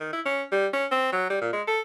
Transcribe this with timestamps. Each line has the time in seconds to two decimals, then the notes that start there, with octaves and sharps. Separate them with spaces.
0.01 D#3
0.13 E4
0.26 C#4
0.52 G3
0.73 C#4
0.91 C4
1.13 F#3
1.30 G3
1.42 A#2
1.53 G#3
1.68 A4